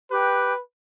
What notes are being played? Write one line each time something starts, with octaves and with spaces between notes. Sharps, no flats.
G4 B4 G5 F#6